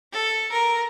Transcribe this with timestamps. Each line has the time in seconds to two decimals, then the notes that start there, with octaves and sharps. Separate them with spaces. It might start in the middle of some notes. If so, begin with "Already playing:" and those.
0.12 A4
0.52 A#4